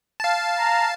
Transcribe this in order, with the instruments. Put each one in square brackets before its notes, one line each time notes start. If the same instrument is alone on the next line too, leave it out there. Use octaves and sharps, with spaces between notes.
[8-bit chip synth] F5 A5
[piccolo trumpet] A#5